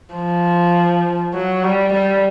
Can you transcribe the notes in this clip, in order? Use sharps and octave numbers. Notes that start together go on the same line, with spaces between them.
F3
F#3
G3
G3